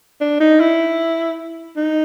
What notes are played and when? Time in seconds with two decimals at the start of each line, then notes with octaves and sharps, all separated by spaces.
0.21 D4
0.40 D#4
0.60 E4
1.77 D#4